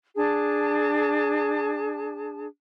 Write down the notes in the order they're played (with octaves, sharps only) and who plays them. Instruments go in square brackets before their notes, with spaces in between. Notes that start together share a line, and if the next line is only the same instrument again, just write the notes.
[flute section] D4 G#4 A5